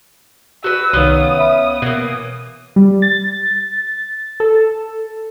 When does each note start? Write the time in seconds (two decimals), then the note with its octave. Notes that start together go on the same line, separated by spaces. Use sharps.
0.64 F#4 B4 E6
0.93 C2 D#3 B3 C#4 F5 D#6
1.37 E5 B5
1.82 B2 E3 A#3
2.76 G3
3.02 A6
4.40 A4